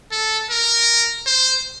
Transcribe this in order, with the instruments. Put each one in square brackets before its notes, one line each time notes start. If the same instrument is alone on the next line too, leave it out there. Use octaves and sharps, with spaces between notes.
[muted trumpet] A4
A#4
C5